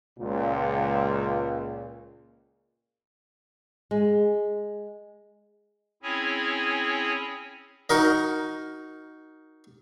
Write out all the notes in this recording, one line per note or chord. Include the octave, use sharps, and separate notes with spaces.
C#2 A#2
G#3
C4 C#4 E4 G#4 C#5 G#5
D#4 F#4 A#4 D#5